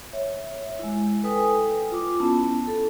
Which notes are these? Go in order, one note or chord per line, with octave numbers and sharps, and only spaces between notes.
C#5 E5
G#3 E4
A4 B4 G5 G#5 D#6
F4 D6
B3 C#4 E4 A5
A4